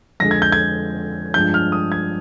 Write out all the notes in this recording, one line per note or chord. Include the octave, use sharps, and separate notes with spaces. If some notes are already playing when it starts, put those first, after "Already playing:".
F2 D3 G#3 A#6
G#6
G6
G#6
G2 F3 G#3 G6
F6
D#6
G#6